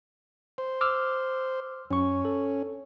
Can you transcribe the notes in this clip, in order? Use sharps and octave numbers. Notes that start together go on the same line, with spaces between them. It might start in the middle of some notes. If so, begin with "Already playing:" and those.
C5
D6 E6 F6
F#2 C#4 C#6
A4